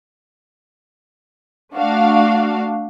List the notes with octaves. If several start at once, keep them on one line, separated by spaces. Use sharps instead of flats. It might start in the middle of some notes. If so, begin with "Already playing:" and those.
A3 D4 F#4 F5